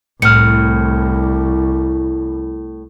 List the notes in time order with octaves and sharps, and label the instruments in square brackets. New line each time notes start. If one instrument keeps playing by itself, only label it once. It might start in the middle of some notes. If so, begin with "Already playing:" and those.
[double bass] C2 [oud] A2 [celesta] F6 C#7